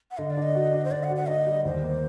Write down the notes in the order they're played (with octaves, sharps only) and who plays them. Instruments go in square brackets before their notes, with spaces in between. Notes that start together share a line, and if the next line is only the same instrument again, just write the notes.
[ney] F#5
[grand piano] D3 [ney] D#5
[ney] D5
[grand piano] D4
[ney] D#5
[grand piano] F#4
D4
[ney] C5
[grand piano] D3 [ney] D5
[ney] F#5
[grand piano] F#4
[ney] F#5
[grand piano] D4 [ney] D#5
[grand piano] G3
[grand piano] D#2 [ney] C5
[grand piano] A#3